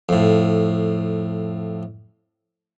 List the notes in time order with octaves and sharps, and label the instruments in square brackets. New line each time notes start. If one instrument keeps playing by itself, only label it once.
[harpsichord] F2 A2